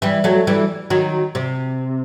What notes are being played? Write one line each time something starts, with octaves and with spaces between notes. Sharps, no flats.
E3 G3
F#3 A3
E3 G3
D#3 F#3
C3